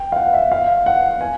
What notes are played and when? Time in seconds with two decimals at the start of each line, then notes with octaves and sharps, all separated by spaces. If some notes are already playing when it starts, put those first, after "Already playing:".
Already playing: G5
0.12 F5
0.16 F#5
0.34 E5
0.52 F5
0.86 F#5
1.21 G#5